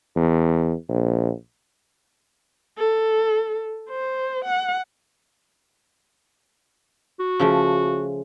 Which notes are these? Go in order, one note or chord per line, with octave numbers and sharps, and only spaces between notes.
E2
A#1
A4
C5
F#5
F#4
C#3 F3 A3